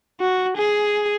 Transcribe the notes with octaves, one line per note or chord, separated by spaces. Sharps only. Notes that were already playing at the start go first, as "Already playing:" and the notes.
F#4
G#4